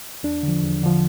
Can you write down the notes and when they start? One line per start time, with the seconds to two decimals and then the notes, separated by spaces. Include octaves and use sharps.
0.23 E2 D4
0.43 D3 F3
0.63 E2
0.83 D3 F3